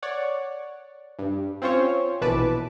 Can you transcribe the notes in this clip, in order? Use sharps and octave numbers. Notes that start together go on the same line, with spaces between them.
C#5 D5 F#5
G2
C4 C#4 F4 C5 C#5
A#1 B2 E3 B4 A5 D6